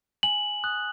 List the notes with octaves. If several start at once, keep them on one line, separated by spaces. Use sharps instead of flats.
G#5 F#7
D#6 F#6